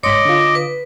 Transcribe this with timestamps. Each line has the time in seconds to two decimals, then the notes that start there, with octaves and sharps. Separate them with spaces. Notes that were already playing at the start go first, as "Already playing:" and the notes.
0.03 G1 G#2 C#5 D#5 C6 D6 B6
0.25 D3 F4
0.55 B4